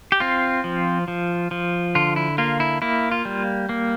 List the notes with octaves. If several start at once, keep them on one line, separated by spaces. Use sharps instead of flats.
G4
C4 F4
F3
F3
F3
D3 F4
E4
A#3 F4
E4
A#3 E4
F4
G3
A#3